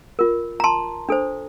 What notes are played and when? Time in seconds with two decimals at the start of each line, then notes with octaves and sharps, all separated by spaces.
0.19 F4 A#4
0.60 A#5
0.64 A5 C6
1.09 D4 A4 C5